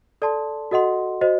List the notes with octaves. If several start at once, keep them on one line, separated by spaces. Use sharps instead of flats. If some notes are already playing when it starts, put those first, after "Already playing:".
A4 D5 A5 C6
F#4 A4 D#5 F#5 C6
F#4 C5 D#5